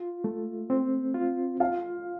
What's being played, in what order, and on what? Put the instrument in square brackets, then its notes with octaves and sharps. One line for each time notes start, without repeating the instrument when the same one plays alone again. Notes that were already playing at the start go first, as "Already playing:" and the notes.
Already playing: [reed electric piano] F4
A3
C4
F4
[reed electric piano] F4 [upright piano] F5